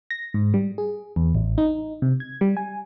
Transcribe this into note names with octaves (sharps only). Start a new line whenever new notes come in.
A#6
G#2
G3
G#4
E2
A1
D#4
C3
G#6
G3
G#5